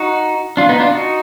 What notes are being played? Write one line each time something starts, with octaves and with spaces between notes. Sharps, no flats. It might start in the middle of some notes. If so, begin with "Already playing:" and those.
Already playing: D#4 F#4
D4 F4
B3 D#4
D4 F4
D#4 F#4